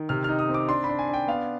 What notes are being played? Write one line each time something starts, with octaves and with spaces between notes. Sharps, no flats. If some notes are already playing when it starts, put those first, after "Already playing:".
Already playing: D#3
C3 F6
D#4 F6
D#6
C4
D6
D4 C6
B5
D4
G#5
D4
G5
B3 F5